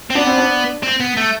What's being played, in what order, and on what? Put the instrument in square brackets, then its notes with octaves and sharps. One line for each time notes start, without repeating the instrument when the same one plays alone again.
[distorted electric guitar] C4
[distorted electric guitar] B3 [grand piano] D4
[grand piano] C4
D4
[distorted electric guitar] C4
B3
A3